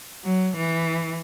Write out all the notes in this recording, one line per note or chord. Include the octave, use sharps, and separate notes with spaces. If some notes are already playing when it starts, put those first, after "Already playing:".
F#3
E3